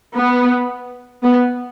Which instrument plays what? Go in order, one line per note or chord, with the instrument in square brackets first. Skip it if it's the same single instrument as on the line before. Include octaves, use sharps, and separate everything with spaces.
[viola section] B3
B3